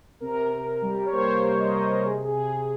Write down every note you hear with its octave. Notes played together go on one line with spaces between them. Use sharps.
C3 A#4
C3
G3
C#5
A#3 C5
C3
D#5
C3
C3 G#4
G#4
C3